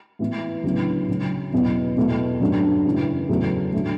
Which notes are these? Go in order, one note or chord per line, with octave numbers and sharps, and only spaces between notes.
A2 E3 B3
D2 C#3 F#3 B3 E4
C#3 F#3 C#4
E2 B2 F#3 C#4 E4
E2 B2 A3 E4
G2 D3 F#3 A3 C#4
F#2 C#3 E3
E2 C#3 F#3 A3
D3 A3